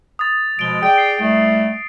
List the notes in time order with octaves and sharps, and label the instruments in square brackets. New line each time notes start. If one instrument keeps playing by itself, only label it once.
[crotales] D#6 A6
[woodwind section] B2 F3 G#3 [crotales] D7 G7
[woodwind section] G#4 D5 G5 [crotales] D7
[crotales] C7
[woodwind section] C2 G3 A3